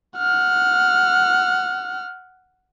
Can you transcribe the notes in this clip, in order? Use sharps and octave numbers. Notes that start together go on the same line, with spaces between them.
F#5 F6